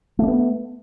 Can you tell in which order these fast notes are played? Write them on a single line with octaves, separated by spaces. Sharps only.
A3 D4 B3